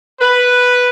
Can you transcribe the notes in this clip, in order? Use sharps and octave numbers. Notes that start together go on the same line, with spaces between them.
B4